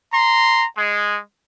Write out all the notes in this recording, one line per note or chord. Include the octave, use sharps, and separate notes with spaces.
A#5 C6
G#3